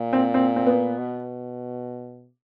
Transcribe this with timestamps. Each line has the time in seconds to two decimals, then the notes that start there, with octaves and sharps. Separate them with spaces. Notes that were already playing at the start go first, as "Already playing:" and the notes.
Already playing: A#2
0.13 C4
0.34 C4
0.56 C4
0.67 B3
0.98 B2